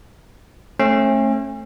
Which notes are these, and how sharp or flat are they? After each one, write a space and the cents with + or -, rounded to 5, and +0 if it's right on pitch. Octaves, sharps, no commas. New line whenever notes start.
A3 +0 C#4 -40